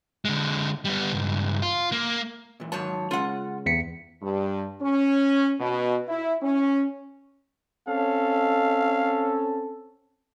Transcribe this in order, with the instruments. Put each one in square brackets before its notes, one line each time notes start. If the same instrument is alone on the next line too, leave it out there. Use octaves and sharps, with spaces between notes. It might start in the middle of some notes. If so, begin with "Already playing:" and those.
[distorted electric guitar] D3 G#3
G3 B3
C#2 G2
F4
A#3
[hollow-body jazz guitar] A#2 E3
[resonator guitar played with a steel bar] G#2 C#5 A5 [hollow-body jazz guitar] D#3 F#3
[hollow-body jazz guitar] C#3 G#3 C#4 [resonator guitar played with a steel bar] F4 F#5
[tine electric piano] E2 B6 C#7
[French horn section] G2
C#4
B2
E4
C#4
[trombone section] C4 C#4 A4 [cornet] F5